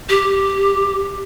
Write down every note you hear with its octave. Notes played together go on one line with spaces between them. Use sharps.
G4